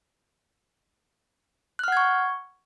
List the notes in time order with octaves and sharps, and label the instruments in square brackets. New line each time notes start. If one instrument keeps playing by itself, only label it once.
[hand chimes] F#6
F6
F#5
G#6
C#6